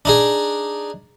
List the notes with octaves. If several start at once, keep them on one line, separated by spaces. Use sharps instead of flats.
D4 D#4 G#4